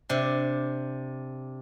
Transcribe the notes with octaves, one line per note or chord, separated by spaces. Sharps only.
C3 D4